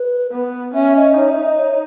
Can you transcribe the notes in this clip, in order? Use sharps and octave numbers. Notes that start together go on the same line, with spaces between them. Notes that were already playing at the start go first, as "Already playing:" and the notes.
Already playing: B4
B3
C#4 E5
D#5
D#4 C#5
E5
D#5
C#5